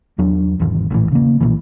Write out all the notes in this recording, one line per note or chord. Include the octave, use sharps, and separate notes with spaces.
E2 F#3 D4
G#1 E2
A#1 A2 C3 E3
C#3 A#3
B1 A#2 E3